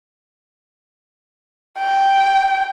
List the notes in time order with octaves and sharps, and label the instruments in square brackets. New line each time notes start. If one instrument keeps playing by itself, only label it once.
[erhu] G5